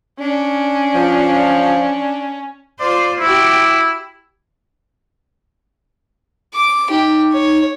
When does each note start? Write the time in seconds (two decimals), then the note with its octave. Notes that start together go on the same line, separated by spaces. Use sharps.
0.20 C#4 D4
0.95 F3
2.80 F4 C5 D5
3.20 E4 F#4 G4
6.54 D6
6.90 D#4 G4
7.33 C#5